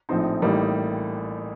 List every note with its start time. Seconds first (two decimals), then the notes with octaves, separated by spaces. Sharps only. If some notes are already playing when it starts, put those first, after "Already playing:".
0.09 A#1 A2 F3 C4 D#4 C5
0.42 A1 A2 G3 A#3 D#4